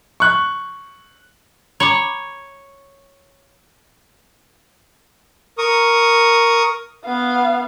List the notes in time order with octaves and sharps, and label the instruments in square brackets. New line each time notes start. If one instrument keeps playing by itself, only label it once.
[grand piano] C#6 F#6
[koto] C#5 [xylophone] A#5 B5 D6
[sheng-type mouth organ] A#4 C#6 D#6
[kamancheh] B3 F5